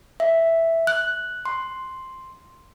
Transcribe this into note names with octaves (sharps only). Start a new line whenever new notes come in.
E5
F#6
C6